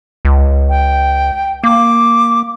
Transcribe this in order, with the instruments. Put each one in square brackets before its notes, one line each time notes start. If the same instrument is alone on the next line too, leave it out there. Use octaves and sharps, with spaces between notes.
[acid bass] C#2
[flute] G5
[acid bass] A#3 [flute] D6